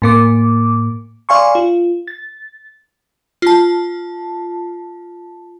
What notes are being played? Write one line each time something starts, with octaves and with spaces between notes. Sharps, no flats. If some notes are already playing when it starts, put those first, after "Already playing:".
A2 A#3 D6
D5 F5 G#5 C6 C#6
F4
A6
F4 A5